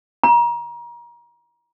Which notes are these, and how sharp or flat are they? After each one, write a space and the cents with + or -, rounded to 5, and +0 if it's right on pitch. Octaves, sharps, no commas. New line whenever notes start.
A#5 +30